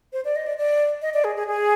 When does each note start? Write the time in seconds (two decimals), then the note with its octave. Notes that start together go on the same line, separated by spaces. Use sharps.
0.13 C5
0.25 D5
0.36 D#5
0.46 D5
0.58 D5
1.02 D#5
1.14 D5
1.24 G#4
1.36 G#4
1.47 G#4